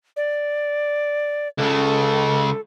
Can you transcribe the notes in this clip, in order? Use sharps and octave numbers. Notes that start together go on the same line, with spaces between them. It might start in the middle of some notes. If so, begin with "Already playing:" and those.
D5
C#2 C#3 A4